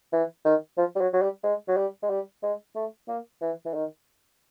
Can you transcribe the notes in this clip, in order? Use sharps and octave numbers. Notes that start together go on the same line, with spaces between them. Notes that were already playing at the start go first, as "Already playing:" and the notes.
E3
D#3
F3
G3
F#3
F#3
G3
G#3
F#3
G3
G#3
G3
G#3
A3
A#3
E3
E3
D#3